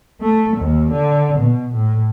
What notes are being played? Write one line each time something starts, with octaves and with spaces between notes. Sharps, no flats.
A3
D#2
D3
B2
A2